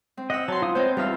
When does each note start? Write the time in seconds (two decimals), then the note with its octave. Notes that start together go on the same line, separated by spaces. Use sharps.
0.17 C4
0.30 D#5 F#5 E6
0.48 F#3 A5 C6
0.62 F4 F5 D#6
0.75 B3 C4 C5 C#5 D#5
0.97 E2 G3 F4 F5 E6 F6